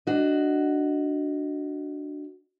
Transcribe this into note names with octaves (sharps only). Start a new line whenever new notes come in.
D4 F#4 D#5